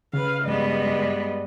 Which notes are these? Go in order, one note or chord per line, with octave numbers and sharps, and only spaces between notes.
C#3 B4 F5
G2 G#3 B3 D5 D#5